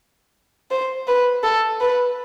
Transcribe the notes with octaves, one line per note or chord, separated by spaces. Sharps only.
C5
B4
A4
B4